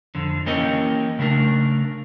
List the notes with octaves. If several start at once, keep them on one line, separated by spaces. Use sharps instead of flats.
F2 D3
E3 A#3 C#4 G4 A#4 D#5
C#3 A3 D4 A#4